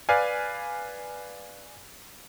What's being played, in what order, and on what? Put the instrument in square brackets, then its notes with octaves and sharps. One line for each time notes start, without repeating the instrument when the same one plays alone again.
[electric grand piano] B4 D5 F5 G#5